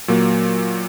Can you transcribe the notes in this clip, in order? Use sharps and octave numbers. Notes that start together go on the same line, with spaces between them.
A#2 F#3 A#3